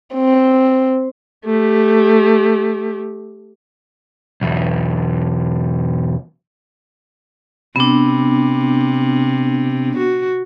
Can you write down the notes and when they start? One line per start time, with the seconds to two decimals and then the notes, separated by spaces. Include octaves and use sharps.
0.14 C4
1.45 A3 G4
4.41 B1 E2
7.76 C3 B3 D4
9.97 F#4